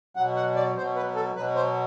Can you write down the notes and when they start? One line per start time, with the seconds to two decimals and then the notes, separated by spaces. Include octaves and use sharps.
0.16 B2 F#3 F#5
0.36 F#5
0.56 D5
0.76 B2 F#3 C5
0.96 B4
1.15 A4
1.35 B2 F#3 B4
1.55 C5